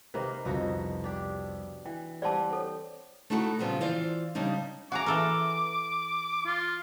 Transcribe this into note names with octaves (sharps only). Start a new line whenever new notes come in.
C3 D#3 A#3 B4 C5 D#5
C2 F2 B2 F3 D#4 F#4
D4 G4
E3 G5
G3 C4 G4 C5 D5 F#5 A5
A4 C#5
A3 D#4 E4 F#4 G#4 A4
A#2 C#3 F3 G3 B3
E3 F4 C5 D5
C#3 G3 D4 D#4
F#4 G#4 A#5 D6
E3 A4 A#4
F4